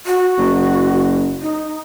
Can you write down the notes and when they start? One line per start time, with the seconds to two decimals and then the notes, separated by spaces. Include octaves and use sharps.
0.06 F#4
0.38 F#1
1.41 D#4